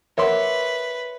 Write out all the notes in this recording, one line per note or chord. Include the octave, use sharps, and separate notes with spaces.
A#4 B4 C#5 E5 F#5 C6 D6